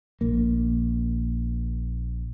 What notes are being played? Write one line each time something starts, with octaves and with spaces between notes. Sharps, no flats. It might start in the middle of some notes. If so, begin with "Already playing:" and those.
A#1 A#3